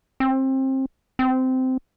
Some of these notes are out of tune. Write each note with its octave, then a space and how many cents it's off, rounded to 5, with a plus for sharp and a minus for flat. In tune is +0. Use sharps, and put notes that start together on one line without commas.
C4 +25
C4 -15